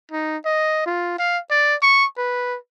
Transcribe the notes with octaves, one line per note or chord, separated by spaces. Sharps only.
D#4
D#5
F4
F5
D5
C#6
B4